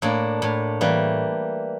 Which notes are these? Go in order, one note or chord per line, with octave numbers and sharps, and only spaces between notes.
A2 A#3 D4
A2
E3 G3 A#3